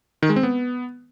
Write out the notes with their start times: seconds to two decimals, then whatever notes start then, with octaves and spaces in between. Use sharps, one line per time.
0.23 D#3
0.29 G#3
0.36 C4
0.43 B3